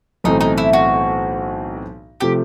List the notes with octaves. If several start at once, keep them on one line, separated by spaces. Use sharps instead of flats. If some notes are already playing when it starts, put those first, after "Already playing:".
B1 A2 E3 A3 C4 D#4
D#4
E4
F#4
C3 F3 A3 G4